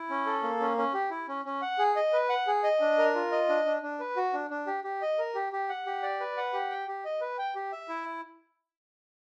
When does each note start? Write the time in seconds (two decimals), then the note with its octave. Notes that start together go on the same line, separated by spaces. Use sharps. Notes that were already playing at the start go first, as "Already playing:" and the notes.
Already playing: E4
0.10 C#4
0.26 A4
0.43 A#3
0.60 C#4
0.77 C#4
0.94 G4
1.10 E4
1.28 C#4
1.45 C#4
1.62 F#5
1.79 G#4
1.96 D#5
2.13 B4
2.29 F#5
2.47 G#4
2.63 D#5
2.80 D4
2.98 A#4
3.15 F4
3.32 D#5
3.49 D4
3.66 D4
3.82 D4
4.00 B4
4.16 F#4
4.33 D4
4.50 D4
4.67 G4
4.84 G4
5.02 D#5
5.18 A#4
5.35 G4
5.53 G4
5.69 F#5
5.86 G4
6.03 D5
6.20 B4
6.37 F#5
6.53 G4
6.71 G5
6.88 G4
7.05 D#5
7.21 B4
7.38 G5
7.55 G4
7.72 E5
7.89 E4